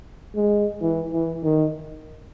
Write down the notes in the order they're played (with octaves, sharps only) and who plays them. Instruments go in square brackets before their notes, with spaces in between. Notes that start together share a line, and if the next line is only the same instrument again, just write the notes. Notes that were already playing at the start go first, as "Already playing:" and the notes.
[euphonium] G#3
E3
E3
D#3